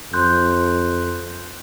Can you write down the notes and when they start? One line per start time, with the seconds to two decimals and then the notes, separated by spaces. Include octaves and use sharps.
0.13 F2 C6 F#6 G6